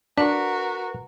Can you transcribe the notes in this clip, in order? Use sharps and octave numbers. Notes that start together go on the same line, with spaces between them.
D4 F#4 A#4 B4